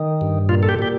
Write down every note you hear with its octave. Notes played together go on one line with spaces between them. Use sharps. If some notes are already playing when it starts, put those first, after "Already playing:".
Already playing: D#3
G2
A#2 F4
A4
G4
A#2 G4